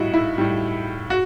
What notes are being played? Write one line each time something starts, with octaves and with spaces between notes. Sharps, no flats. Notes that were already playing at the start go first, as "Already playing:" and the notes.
Already playing: A2 G3 D#4 E4 F#4
E4
A2 G3
F#4